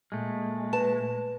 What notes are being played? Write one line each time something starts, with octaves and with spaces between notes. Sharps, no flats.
A#2 G#3 A3
B4 A5